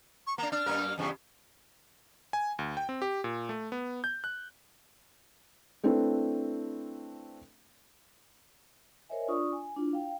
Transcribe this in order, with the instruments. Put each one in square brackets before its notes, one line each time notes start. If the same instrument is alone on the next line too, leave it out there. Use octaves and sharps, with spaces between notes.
[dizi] C#6
[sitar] A#3 D4 [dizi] A#5
[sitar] D4 [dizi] F6
[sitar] F#2 A#3 A#4
E2 G2 C#3
[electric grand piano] G#5
D2
G5
C4
G4
A#2
A3
B3
G6
F#6
[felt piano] A3 C4 D4 E4 B4
[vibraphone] A#4 C5 C#5 D#5 E5 G#5
D4 F4 D5 C#6 D#6
G#5
D4 E4 F4
F5 G5